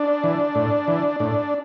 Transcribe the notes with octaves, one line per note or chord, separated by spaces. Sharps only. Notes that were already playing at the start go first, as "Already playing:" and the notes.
Already playing: D4
E3
A2
E3
A2 D4